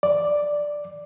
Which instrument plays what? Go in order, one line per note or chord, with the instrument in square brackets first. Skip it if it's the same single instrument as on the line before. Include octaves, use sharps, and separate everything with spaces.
[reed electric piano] D5